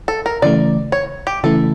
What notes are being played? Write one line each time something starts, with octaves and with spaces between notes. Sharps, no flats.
A4
A#4
C#3 E3 A3 D5
C#5
G4
C#3 E3 A3 E4 A4